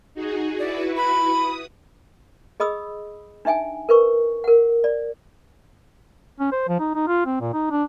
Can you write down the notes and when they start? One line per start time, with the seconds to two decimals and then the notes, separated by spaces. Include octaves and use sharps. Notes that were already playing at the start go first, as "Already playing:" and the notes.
0.14 D#4 F#4 G#4
0.59 E4 F#4 B4 D5
0.96 B5
1.30 D#6
2.60 G#4 D#5 B5 D#6 E6
3.45 D4 D#4 E5 G5 G#5
3.89 A#4 B4 C#6
4.44 A#4 F#5
4.84 D5
6.39 C#4
6.52 C5
6.68 F3
6.79 D#4
6.95 D#4
7.08 F4
7.26 C4
7.41 A#2
7.53 D#4
7.71 D4